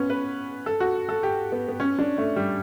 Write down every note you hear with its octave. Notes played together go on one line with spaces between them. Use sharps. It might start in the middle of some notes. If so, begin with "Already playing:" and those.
Already playing: B3 C#4
B4
A4
F#4
A4
G4
B3
B3
C#4
D4
A3
G3